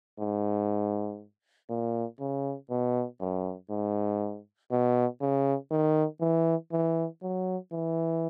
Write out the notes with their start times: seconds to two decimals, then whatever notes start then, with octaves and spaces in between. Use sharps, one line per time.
0.19 G#2
1.70 A#2
2.20 C#3
2.70 B2
3.20 F#2
3.70 G#2
4.71 B2
5.21 C#3
5.71 D#3
6.21 E3
6.72 E3
7.22 F#3
7.72 E3